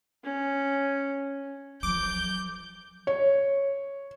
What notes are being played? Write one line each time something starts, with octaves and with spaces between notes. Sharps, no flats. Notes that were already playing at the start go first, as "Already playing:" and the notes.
C#4
F3 F#3 D6 G6
C#5